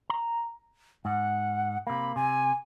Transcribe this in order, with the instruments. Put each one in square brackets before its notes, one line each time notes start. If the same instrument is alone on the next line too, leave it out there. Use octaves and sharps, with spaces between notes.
[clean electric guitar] A#5
[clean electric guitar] G#2 [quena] F#5
[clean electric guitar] C3 A#3 [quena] B5
[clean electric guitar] C3 [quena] G#5